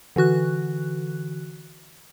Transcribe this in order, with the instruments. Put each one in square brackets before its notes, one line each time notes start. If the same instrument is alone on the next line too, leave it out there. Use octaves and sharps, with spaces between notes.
[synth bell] D3 E3 F#4 F#6